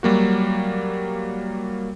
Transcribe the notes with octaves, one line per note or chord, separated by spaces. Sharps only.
F#3 G3 A#3 F#4